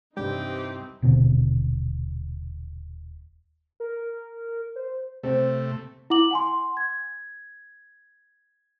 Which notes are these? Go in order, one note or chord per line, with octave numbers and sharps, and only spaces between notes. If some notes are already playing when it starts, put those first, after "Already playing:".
C2 G2 E3 G3 C4 D#4 G4
D#1 B2 D3 C4
A#4
C5
C3 A3 C4
E4 F#5 D6 F#7
F#5 G#5 C6
G#6